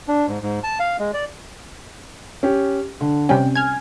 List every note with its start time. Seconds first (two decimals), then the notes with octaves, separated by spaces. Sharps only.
0.08 D4
0.27 G#2
0.42 G#2
0.64 A5
0.80 F5
0.99 G#3
1.14 D5
2.43 C#4 G4
3.01 D3
3.29 C3 G3 C#4 G5
3.55 G#5 F6 G#6